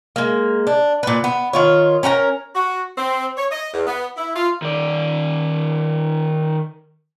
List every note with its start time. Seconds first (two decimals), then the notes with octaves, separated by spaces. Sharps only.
0.16 G#3 A#3
0.67 D4
1.03 A#2 B4
1.24 B3
1.53 D#3 F4 C#5
2.03 C#4 A#4 F#5 A#5
2.55 F#4
2.97 C4
3.37 C#5
3.51 D#5
3.73 E2
3.87 B3
4.17 E4
4.36 F4
4.62 D#3 D5